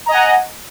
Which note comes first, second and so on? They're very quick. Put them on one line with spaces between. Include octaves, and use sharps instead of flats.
A#5 D#5 G#5 F#5